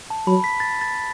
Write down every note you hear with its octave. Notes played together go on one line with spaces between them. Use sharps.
A5
F#3 B5
B6
A6
A6